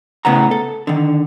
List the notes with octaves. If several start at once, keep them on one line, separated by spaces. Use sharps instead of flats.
A2 C#3 B3 F#5 A#5
A4
D3 D#3